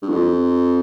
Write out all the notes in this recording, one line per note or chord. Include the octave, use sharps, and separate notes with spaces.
G2
F2